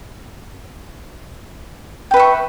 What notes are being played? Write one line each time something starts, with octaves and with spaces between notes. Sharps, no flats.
B4 E5 G5 C#6